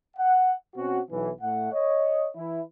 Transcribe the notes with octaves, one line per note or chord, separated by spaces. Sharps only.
F#5
B2 C4 C#4 F#4
B1 E3
A2 A3 F#5
C#5 D#5
E3 E4